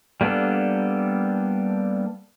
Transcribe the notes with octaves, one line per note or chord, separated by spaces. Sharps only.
G3 A#3 B3 D4 A4